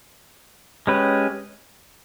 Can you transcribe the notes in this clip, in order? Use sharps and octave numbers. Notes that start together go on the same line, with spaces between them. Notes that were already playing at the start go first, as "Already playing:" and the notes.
G#3 C#4 G4 B4